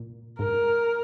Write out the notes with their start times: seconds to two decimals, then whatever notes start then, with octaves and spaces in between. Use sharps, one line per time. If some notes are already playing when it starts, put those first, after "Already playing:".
Already playing: A#2
0.39 G#2 A#4